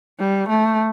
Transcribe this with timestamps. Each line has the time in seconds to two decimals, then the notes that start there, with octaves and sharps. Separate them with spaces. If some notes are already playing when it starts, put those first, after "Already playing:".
0.19 G3
0.48 A3